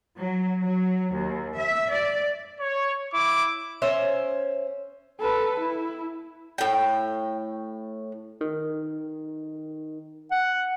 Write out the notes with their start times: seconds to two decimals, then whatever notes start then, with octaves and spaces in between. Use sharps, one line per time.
0.17 F#3
0.64 F#3
1.13 D#2
1.56 E5
1.93 D5
2.60 C#5
3.13 E4 D6
3.82 C#4 C5 E5
5.21 A4 B4
5.60 E4
6.58 A2 G5
8.41 D#3
10.31 F#5